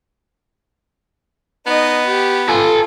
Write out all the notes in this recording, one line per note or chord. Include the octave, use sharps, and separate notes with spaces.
B3 D#4 D#5
G4
F4 A4 G#5